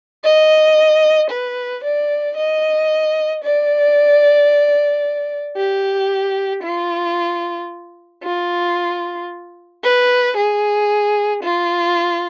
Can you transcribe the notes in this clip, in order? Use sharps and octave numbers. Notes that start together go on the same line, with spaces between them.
D#5
B4
D5
D#5
D5
G4
F4
F4
B4
G#4
F4